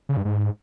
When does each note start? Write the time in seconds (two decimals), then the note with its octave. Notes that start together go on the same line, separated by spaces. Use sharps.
0.09 C#3
0.17 G2
0.25 G#2